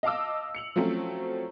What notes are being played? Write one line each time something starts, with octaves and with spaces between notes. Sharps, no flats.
D#5 F5 A5 D6 E6
C#7 F7 F#7
F3 F#3 A3 C4 C#4